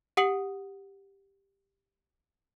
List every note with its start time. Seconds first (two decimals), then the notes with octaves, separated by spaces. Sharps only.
0.17 G4 F#5 D#6 C7 C#7 F#7